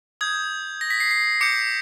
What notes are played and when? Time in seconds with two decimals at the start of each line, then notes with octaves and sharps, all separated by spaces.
0.21 D#6 G6 G#6
0.81 A#6
0.90 B6
1.00 C7
1.11 C7
1.41 D6 G6 C#7